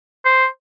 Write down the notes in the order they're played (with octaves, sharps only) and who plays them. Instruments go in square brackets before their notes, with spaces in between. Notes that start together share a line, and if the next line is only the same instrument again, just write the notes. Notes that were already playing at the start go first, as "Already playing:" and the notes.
[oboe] C5